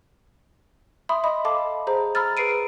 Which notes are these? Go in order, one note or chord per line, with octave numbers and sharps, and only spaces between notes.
E5 B5 C6 D#6
D#5 E5 B5 D#6
A4 F5 A5 B5 D6
G#4 C5 A#5
A#5 B5 E6 F6 A6
G#4 B4 C7 D7 D#7